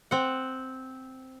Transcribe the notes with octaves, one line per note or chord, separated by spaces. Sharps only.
C4 F#5